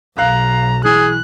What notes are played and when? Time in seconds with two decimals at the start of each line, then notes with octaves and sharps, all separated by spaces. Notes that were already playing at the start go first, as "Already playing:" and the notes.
0.18 B1 F5 A#5 F#6
0.85 E3 G#4 F#6